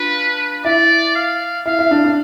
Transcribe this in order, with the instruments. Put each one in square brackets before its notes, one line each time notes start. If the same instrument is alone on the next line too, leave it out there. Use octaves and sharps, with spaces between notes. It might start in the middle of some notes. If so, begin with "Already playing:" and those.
Already playing: [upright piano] D4 F4 [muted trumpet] B4
[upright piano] E4 [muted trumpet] D5
[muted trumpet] F5
[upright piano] E4 [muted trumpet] F5
[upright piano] E4
D4
D4